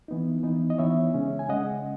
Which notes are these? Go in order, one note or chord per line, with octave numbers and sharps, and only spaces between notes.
E3 B3 D#4
E3 B3 D#4
D#5
E3 B3 D#4 C#5 E5
C#3 G#3 C#4
G#5
C#3 G#3 C#4 D#5 F#5